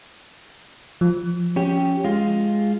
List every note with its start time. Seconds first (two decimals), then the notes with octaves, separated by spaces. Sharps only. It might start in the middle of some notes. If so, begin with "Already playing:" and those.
1.01 F3
1.56 C#4 G4
2.04 G#3 F4